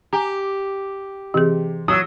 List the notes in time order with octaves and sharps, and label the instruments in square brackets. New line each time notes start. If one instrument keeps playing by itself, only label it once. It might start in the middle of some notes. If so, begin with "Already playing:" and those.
[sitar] G4 [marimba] G#5 A#5
[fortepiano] C3 [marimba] E3 G#4
[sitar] F#3 [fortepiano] D#6 E6